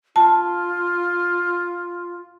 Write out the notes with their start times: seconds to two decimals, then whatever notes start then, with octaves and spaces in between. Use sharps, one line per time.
0.16 F4 A5